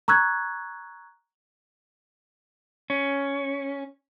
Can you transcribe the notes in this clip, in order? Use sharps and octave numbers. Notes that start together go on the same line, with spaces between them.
A#5 C#6 E6 F#6 G#6
C#4